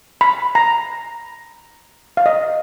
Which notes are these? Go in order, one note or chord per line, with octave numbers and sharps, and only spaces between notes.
B5
A#5
F5
D#5